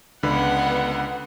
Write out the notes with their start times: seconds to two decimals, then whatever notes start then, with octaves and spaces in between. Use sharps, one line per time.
0.23 C#2 D3 B3 B4 F#5